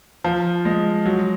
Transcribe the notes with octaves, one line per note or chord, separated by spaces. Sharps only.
F3
G#3
F#3